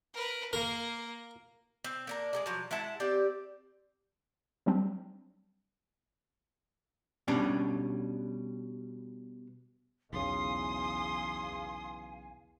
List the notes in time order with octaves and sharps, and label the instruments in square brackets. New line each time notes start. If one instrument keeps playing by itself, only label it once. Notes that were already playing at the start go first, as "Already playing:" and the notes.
[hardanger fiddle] A#4 B4
[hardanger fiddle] A#3 [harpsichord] A#4
[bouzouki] C4
A#3 D4 A#4
G#3 G#4 D5
F3 F#3
G#3 E4 F#5 A5
C4 G4 D5
[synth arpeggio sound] F#3 G3 C4 D4
[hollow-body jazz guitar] B2 G3 C#4 D4
[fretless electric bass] B1 C#3 [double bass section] E2 [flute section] F5 G#5 [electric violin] C6 D#6